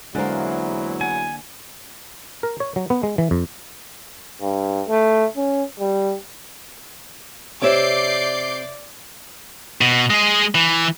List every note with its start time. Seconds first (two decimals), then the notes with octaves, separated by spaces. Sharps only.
0.15 E2 D3 F#3 G#3 A#3 E4 C5
1.01 F#5 G#5
2.43 A#4
2.60 C#5
2.76 F#3
2.90 B3
3.03 G#3
3.18 E3
3.31 F2
4.41 G2
4.88 A3
5.36 C#4
5.80 G3
7.62 C3 C#5 D5 E5 D6 G6 C7
9.81 B2
10.10 G#3 G#4
10.55 E3